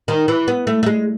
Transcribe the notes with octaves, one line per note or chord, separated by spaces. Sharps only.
D#3
E3
B3
A3
A3
G#3